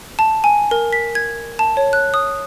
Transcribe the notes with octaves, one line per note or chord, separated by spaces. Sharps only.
A5
G#5
A#4
B6
G#6
A5
C#5
F#6
D#6